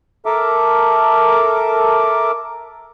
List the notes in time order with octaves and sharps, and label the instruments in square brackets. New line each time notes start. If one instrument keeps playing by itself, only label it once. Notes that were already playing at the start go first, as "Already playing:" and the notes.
[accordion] A4 A#4 E5 D6